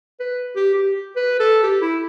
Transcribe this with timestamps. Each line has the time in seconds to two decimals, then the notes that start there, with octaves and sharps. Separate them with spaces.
0.20 B4
0.56 G4
0.74 G4
1.16 B4
1.40 A4
1.64 G4
1.82 E4